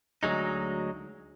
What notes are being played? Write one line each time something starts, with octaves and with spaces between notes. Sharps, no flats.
D2 F#3 G#3 D#4